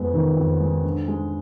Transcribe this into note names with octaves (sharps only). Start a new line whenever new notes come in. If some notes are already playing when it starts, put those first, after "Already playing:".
Already playing: F2 G#3 B3
D#3
F2
G#3
D3
G#3